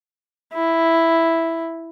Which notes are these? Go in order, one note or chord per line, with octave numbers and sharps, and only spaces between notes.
E4